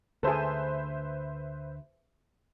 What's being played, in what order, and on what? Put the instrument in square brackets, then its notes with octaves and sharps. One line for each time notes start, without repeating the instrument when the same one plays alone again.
[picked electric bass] D2 D3 D4 [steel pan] G#4 A4 [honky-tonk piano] B4 C5 E5